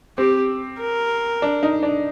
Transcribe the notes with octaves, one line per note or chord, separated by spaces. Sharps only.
C4 G4
A#4
D4
D#4
D4